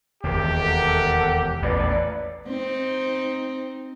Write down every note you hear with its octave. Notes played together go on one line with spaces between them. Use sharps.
E1 D#2 G4
A4 A#4 F#5
A1 E2 A#2 B4 D5
C4 D#4